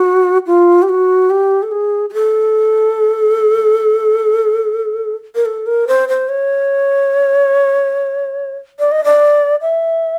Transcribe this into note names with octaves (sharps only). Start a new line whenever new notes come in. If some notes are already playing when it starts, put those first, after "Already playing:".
Already playing: F#4
F4
G4
F#4
G4
A4
G#4
G#4
A4
A#4
A4
A#4
C5
C5
C#5
D5
D#5
D5
E5